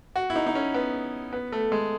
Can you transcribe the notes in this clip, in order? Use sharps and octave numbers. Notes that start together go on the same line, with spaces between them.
F#4
E4
D#4
D#4
C#4
B3
B3
A3
G#3